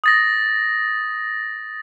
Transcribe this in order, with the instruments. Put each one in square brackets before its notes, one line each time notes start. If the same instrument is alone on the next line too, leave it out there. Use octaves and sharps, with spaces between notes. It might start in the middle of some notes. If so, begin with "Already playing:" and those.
[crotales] D#6 A6 A#6